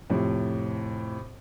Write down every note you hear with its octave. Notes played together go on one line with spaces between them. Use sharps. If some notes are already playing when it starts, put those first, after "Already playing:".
F2 A2 C3